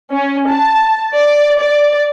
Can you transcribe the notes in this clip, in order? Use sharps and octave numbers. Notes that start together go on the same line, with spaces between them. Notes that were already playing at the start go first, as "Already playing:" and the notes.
C#4
A5
D5
D5